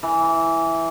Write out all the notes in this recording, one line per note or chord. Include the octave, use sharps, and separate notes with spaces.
E3